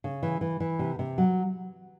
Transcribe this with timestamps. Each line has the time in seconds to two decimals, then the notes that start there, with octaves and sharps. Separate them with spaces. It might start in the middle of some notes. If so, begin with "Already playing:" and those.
0.04 C#3
0.23 E3
0.41 E3
0.60 E3
0.79 C3
0.99 C3
1.18 F#3